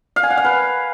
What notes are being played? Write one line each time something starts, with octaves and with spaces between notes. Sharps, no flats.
F5
G#5
F#5
F5
B4